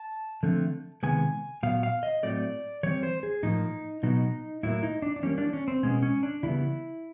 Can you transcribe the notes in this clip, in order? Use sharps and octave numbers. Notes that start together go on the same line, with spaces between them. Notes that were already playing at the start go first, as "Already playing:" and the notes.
Already playing: A5
D3 F3 A3 C4
C3 D#3 G#3 B3 G#5
A#2 F#3 B3 F5
F5
D#5
A2 F#3 A3 C4 D5
E3 G3 C4 C#5
C5
G#4
A2 F3 A#3 D#4
B2 F#3 B3 D#4
A2 F#3 A#3 E4
D#4
D4
D4
E3 G3 A#3 C#4
D4
C#4
C4
B2 G#3 B3 C#4
C#4
D4
C#3 E3 G3 B3 E4